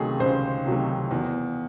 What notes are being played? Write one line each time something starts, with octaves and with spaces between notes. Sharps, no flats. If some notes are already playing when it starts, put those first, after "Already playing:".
Already playing: C#2 C3 D#3 F#3 A3 G#4
C#2 C5
C3 D#3 F#3 A3
E2